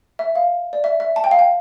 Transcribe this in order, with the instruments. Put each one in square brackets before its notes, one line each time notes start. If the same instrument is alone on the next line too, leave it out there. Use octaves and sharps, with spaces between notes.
[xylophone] E5
F5
D5
E5
E5
A5
G5
F5
G5